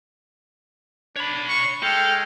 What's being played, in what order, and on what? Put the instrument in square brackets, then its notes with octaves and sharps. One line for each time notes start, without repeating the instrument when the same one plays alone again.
[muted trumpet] D4 [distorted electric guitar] C#5 B5
[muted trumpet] C#6
[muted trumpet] G#3 [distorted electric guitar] A4 [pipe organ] G5 F6